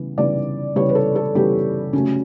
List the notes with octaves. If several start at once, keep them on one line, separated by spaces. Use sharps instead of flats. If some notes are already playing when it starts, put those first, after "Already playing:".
Already playing: C#3 E3 G3 B3
C#3 E3 G3 B3 D5
C#3 E3 G3 B3 C#5
B4
A4
A4
C#3 E3 G3 B3 G4
C#3 F#3 A3 C#4